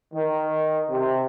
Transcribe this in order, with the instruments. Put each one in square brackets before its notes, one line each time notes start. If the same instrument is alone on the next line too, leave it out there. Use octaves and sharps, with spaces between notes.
[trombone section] D#3
C3